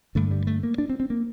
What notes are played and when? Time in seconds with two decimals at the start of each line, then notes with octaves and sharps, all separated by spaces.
0.15 G2 D3 A3
0.31 G3
0.47 A3
0.63 A#3
0.78 D4
0.90 C4
1.00 C4
1.10 A#3